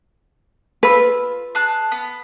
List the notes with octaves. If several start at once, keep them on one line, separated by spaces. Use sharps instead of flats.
F4 B4 E6
G#4 A5 F#6
B3